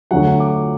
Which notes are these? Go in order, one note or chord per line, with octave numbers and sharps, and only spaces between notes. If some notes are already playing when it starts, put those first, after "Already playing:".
D2 D3 F#3 F#5
D6